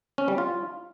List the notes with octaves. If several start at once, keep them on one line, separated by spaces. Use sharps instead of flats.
C#4
G3
F4